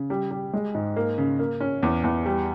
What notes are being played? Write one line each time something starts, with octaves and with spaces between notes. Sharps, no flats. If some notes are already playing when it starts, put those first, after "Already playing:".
Already playing: C#3
G3
G3
G#3
G#2
A#3
C#3
A#3
C#4
E2
E2
G3